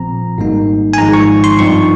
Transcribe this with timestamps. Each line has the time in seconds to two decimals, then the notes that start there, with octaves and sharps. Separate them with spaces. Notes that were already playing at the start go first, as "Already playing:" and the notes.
Already playing: A#1 A#2 F3 C4 A#5
0.38 G#1 G#2 G3 A#3 D#4
0.93 G#5
0.98 G#1 G#2 F3 G#3 D#4 A#5
1.14 C#6
1.44 C6
1.59 G2 F3 C4 D#4 C#6